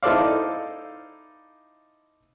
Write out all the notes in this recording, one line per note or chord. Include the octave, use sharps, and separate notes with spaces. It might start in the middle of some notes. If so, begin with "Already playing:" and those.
D#4 E4 A4 C5 D5 F5